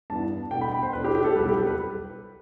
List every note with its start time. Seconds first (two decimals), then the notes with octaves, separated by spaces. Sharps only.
0.10 G2 E3 B3 D4 A5
0.51 B2 A3 D4 G5
0.61 B5
0.72 G5
0.83 C5
0.93 B2 A3 D4 B4
1.04 G4
1.15 G4
1.24 A4
1.35 C2 B2 F#3 B4
1.46 G4
1.57 A4
1.67 B4